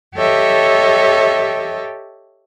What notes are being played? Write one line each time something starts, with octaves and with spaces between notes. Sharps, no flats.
G4 A4 C#5 D#5 E5